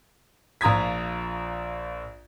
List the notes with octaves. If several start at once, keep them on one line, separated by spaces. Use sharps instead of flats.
A#1 F4 A#5 D#6 G#6 B6